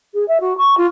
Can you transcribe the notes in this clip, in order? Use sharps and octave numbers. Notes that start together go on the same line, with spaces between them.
G#4
E5
F#4
C#6
F4